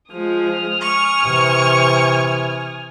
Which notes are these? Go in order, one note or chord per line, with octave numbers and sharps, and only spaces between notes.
F3 G#3 D#6 F6
G#5 C#6
C3 E3